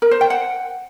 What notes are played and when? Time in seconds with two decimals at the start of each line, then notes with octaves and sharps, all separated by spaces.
0.02 A#4
0.11 C5
0.21 G5
0.30 F#5